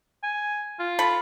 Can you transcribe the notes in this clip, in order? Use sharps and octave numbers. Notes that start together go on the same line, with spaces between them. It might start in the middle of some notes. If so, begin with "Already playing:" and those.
G#5
F4
A4 B5